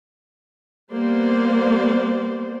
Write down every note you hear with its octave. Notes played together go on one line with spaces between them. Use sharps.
G3 A#3 B3 C5 D5